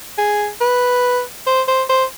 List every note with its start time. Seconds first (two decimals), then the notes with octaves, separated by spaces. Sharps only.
0.18 G#4
0.61 B4
1.47 C5
1.68 C5
1.89 C5